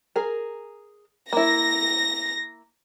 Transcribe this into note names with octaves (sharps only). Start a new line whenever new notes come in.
G#4 A#4
A#3 E4 A#6